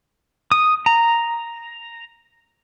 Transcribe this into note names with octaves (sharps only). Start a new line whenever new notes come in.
D#6
A#5